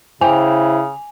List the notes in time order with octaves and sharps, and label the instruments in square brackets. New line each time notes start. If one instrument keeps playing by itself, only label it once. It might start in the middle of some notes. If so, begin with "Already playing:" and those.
[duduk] C#3 [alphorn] E4 [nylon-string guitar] C5 G5 [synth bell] G#5